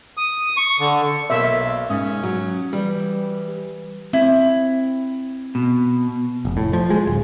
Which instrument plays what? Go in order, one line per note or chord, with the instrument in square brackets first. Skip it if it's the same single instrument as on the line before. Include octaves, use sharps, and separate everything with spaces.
[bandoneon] D#6
C#6
D3
[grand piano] B1 A#3 [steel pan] E5
[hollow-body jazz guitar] G#2 [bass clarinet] C#4 [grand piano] D#6
[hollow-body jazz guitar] F#3
[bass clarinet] E3 [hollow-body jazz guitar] G3
[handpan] C4 [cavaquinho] E4
[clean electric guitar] B2
[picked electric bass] F1
A2
F3
G#3
D1